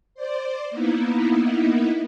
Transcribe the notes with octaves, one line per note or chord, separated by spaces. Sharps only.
C5 D5
A#3 B3 D#4 E4